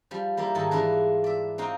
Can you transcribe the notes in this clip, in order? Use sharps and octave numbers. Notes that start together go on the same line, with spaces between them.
F3 G3
G3 A#3 E4 D5
G#2 D#3 A4 G#5 A5
E3 G#3 D4 E4 F4
D5 E5
C4 D#4 F#4 F5 G5